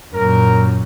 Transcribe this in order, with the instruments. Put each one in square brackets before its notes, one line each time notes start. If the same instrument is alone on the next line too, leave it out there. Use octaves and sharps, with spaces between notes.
[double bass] F#2 A#2 [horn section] A#4